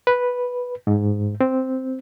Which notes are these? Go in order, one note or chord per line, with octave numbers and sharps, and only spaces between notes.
B4
G#2
C4